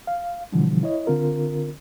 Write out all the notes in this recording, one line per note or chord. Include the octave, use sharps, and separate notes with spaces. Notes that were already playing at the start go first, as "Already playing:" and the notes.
F5
B2 D3 E3 F3 G3
E4 C#5 D#5
D3 C4 F4 A#4